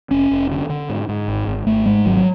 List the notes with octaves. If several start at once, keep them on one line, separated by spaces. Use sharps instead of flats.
F1 C#4
F1
D3
D3
G#2
G#2
G#1
G#1
G#1 A3
G#2 G#3
G#1 F#3
F#3